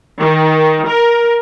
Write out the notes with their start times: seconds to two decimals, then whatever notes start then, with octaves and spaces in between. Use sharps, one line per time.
0.19 D#3
0.87 A#4